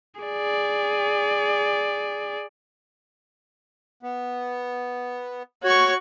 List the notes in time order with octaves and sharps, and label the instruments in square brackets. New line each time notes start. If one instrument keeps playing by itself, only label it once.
[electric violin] G#4 D5
[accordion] B3
[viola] F#4 C#6 [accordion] C#5